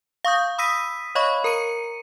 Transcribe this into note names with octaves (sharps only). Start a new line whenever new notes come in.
F5 C#6 D#6 G6
B5 D#6 E6 A#6 B6 D#7
C#5 D#5 F5 B5 C#6
A#4 A#5 C#7 D#7